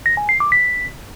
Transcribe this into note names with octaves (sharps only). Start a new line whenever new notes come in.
A#6
G#5
C7
D6
B6